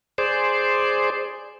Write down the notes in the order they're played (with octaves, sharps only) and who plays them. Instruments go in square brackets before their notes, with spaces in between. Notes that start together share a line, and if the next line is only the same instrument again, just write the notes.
[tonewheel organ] G#4 C5 D5